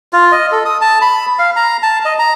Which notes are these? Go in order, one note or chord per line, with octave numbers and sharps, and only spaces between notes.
F4
D#5
A4
D#6
A5
B5
F5
A#5
A5
D#5
A#5